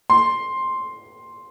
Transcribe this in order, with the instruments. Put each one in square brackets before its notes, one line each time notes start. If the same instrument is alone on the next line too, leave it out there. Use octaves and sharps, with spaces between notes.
[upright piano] C6